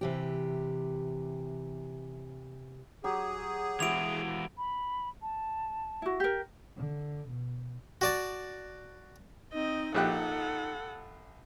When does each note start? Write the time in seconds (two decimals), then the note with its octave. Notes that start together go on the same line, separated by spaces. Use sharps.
0.01 C3 E3 G4
3.04 F#3 G4 G#4
3.80 E3 G#3 E4 F#4 G4 D7 F7
4.57 B5
5.22 A5
6.02 E4 F#4
6.20 G4 A#4
6.77 D3
7.29 B2
8.01 F#4 D5 A5
9.53 C4 D#4 D#5
9.95 A#1 G4 A4 F#5 F#6